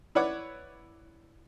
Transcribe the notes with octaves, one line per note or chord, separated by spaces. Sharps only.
E4 B4 C#5 D5 F#5 D6